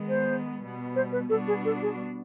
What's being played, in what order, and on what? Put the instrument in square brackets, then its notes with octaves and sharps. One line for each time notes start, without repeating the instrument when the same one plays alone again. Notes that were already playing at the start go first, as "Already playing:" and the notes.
Already playing: [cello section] D#3 G#3 B3
[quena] C5
[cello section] B2 G3 B3
[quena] C5
B4
[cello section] B2 G3 B3 D4 F#4 [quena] A4
[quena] G#4
A4
G#4